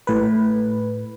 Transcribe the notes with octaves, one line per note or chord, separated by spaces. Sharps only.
A2 B4